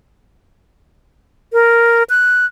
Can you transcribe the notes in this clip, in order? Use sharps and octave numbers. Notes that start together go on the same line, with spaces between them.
A#4
F#6